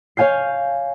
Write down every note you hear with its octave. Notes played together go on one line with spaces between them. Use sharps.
C#5 F5 G#5 G6 C7